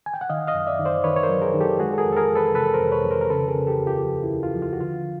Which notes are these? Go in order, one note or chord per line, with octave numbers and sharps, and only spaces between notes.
G#5
G5
F#5
D#3 D#5 F5
D#5 F5
F#2
D5 E5
D#3
C5 D5
D#3 B4 C#5
C#5
A#4 C5
F#3
G#4 A#4
D#3
G4 A4
G#3 F#4 G#4
A4
G#4 A#4
F2
A4
G#4 A#4
F2
A4 B4
C3 A4 B4
A#4 C5
F2
B4 C#5
F2
A#4 C5
A#4
C#3 A4 B4
G#4 A#4
C#3
G4 A4
D#2
F4 G4
F3
E4
D#2
F4
F3
F4
F#4
D3 F4